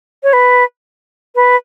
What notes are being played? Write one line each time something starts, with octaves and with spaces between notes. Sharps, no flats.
C#5
B4
B4